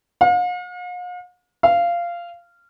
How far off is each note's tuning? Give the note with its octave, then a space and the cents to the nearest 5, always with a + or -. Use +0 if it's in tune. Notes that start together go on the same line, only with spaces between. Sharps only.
F5 +45
F5 -15